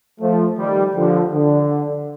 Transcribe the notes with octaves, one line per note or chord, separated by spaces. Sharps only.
F3 A3
D#3 G3
D3 F3
D3